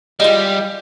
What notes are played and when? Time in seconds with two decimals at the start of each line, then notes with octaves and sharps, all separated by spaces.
0.20 G3 G#3 E4 F4